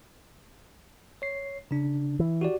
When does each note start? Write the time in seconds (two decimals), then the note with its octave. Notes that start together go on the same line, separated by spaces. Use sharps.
1.22 C#5 C7
1.71 C#3 D4
2.19 E3
2.41 F#4 G4 D5